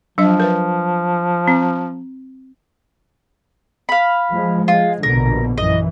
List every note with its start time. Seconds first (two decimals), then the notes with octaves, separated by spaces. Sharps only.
0.18 F3 F#3 D4 D#5
0.40 A#4 B4 E5
1.48 C4
3.89 F5 B5
4.33 F3 G#3
4.68 G#3 F4
5.03 A#1 B2 D3 A#4
5.58 F#2 E3 D#5